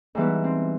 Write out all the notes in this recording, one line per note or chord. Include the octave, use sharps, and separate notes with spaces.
G#2 E3 G3 B3
C4